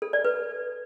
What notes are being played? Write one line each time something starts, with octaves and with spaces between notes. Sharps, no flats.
A4
D5
B4